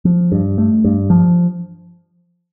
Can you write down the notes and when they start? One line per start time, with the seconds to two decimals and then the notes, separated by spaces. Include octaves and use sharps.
0.05 F3
0.32 G2
0.58 A3
0.84 G2
1.10 F3